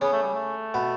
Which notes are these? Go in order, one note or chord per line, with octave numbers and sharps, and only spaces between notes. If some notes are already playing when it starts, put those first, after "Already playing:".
C#3 B3 C#4
A3
G3
A3
B2 B3